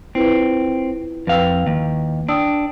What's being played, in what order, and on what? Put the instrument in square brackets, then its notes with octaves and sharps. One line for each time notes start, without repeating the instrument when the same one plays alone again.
[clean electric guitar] C4 [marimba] E4 F4 B4
[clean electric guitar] F2 F5 [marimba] B4 G5 E6
[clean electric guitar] D#2
[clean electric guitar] D4 [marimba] G5 D#6 E6